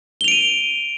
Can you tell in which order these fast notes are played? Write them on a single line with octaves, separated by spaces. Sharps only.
G7 F7 D7 D#7